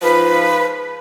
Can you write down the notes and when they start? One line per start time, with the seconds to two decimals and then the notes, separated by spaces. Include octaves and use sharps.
0.02 G#2 F3 B4